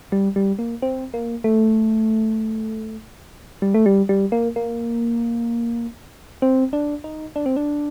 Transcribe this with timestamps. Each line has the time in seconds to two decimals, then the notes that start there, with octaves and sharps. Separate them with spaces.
0.12 G3
0.36 G3
0.59 A#3
0.82 C4
1.14 A#3
1.44 A3
3.62 G3
3.74 A3
3.86 G3
4.09 G3
4.32 A#3
4.56 A#3
6.42 C4
6.73 D4
7.04 D#4
7.36 D4
7.46 C4
7.56 D4